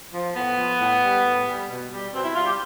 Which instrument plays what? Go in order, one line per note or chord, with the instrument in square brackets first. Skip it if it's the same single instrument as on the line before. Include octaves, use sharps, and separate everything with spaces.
[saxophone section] F3
A2 B3
F3
A2
G3
A2
G3
B2
G3
B2 C4
E4
G3 F4
G4